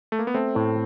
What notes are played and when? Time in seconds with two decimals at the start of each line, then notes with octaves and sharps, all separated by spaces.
0.12 A3
0.19 A#3
0.27 B3
0.34 A3 C4
0.55 A2